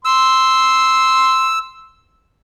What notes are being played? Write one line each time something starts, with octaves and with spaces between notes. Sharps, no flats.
C6 E6